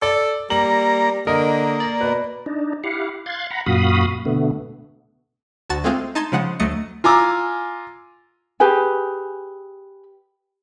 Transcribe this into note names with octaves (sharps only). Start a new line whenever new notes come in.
A4 D5
G3 A#3 A#5 F#7
D3 A#3 A#4 D#5
D5
B2 B4
D4 D#4
E4 G4 F5 F#5
F5 C6 F#6 G#6 A6
F#5 A#5 B5
F#2 A#2 F#4 F5 B5 D#6
B2 D3 A3 B3
D2 F#4 A5 A6
G#3 A3 C4 F4 G#4
D#4 A5 C6 G#6
C#3 F3 G#3 F#5
D2 F#3 A3 D#5 C#7
F4 G#5 A#5 D6 E6
G4 G#4 B4 G#5